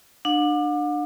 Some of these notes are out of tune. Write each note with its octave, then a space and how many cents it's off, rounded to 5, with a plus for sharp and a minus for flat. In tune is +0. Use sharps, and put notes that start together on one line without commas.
D4 +25 F#5 -45